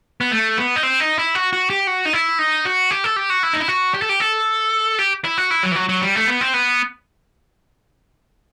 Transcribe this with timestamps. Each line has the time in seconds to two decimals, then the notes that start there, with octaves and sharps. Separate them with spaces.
0.21 B3
0.31 A3
0.57 B3
0.76 D#4
0.83 C4
1.00 D#4
1.18 E4
1.35 F#4
1.53 F#4
1.70 G4
1.87 F#4
2.05 D#4
2.13 E4
2.39 D#4
2.65 F#4
2.91 G4
3.04 A4
3.16 G4
3.30 F#4
3.43 E4
3.53 D#4
3.60 E4
3.68 F#4
3.94 G4
4.02 A4
4.09 G4
4.20 A4
4.99 G4
5.25 E4
5.38 F#4
5.51 E4
5.63 F#3
5.72 E3
5.76 F#3
5.89 F#3
6.01 G3
6.15 A3
6.27 B3
6.41 C4
6.54 B3